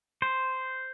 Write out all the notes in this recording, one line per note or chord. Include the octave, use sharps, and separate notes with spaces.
C5